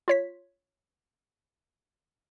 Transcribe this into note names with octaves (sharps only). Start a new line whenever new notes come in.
F4 C#5 B6